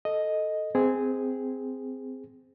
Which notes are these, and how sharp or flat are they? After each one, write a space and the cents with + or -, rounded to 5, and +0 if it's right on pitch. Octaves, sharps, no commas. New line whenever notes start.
A4 +0 D#5 +0
C4 -15 G#4 -5